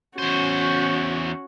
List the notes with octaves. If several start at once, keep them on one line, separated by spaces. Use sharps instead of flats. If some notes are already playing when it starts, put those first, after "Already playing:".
E2 C#4 F#4 C5